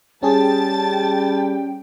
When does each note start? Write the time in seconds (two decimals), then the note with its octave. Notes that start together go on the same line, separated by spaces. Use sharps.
0.23 G3 C#4 G#4 G5 A5 A6